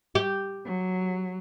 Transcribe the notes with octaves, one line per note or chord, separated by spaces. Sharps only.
G4
F#3